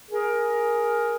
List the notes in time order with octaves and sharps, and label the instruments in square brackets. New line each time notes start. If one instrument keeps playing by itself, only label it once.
[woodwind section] G#4 A#4